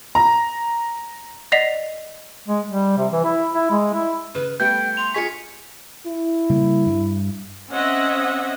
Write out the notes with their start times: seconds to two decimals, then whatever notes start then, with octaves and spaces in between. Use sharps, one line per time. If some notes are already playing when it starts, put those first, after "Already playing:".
0.15 A#5
1.52 D5 D#5 F#5 B6 C7 F7
2.48 G#3
2.68 G3
2.97 C3
3.12 E3
3.24 E4
3.54 E4
3.71 G#3
3.93 E4
4.35 C#3 B4
4.60 G3 A3 B3 G5 G6
4.97 C6 F7
5.14 F4 G#4 G#5 C#6 B6 C#7
6.07 E4
6.50 C#3 G3 A#3
6.86 G2
7.71 C4 C#4 D#5 E5 F#5